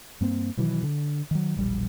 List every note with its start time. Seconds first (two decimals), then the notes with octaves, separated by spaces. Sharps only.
0.21 G2 A#3 C4
0.57 B2 D#3 E3 F#3
0.83 D3
1.31 D#3 F#3
1.56 E1 A#1 G3